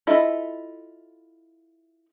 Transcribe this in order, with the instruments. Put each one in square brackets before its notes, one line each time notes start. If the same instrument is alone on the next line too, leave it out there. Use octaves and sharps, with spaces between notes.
[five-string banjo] E4 F4 A4 D#5 E5